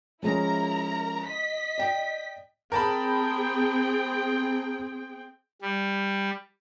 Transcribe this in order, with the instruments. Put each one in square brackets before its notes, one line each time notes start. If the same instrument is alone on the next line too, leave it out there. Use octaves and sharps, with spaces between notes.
[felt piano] F3 G#3 C#4 [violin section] E4 A#4 A#5
[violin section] D#5 B6
[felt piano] D5 G5
[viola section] C4 G#4 G5 [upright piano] A#4 A5 B5
[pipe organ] G3